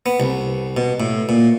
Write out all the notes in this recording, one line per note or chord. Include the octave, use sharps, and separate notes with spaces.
B3
C2
B2
A2
A#2